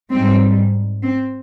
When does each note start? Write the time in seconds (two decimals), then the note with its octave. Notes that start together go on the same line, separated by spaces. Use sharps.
0.11 G#2 G3 C4
1.02 C4